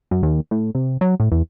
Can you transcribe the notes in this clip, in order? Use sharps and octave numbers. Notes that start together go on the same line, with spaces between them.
F#2
D#2
A2
C3
F#3
A2
E2